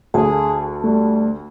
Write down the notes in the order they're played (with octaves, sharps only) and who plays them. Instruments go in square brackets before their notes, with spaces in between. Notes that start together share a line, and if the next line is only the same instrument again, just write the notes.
[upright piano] D2 [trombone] G#4 [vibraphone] A5
[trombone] G3 [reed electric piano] A3